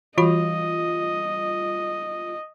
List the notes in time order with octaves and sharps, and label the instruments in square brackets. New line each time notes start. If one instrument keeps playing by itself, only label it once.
[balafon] E3 F#4 B5 [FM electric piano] G3 F4 [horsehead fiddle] D#5